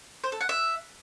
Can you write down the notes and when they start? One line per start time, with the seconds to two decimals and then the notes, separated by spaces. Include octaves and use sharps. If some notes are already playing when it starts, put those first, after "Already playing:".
0.24 C5
0.32 A4
0.41 F#5
0.49 E5